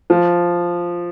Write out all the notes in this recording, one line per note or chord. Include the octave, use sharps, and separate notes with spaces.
F3